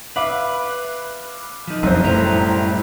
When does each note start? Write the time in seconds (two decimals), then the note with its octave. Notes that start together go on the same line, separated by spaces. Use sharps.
0.16 B4 E5 F5 D6
1.67 F3 D#4
1.83 F#1 B1 F2 C5
2.03 A2 G3 A#5